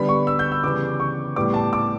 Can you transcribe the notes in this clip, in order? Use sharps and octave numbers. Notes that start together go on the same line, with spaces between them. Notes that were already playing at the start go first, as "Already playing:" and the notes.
Already playing: D3 G3 B3 B5
C#6
E6
G6
E6
C#3 E3 G3 B3 D6
C#6
A2 G3 B3 D6
A5
D6